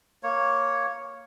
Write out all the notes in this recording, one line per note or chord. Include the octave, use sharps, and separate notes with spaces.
A#3 C#5